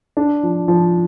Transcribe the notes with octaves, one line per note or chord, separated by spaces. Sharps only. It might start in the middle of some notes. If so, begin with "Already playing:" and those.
D4
F3
F3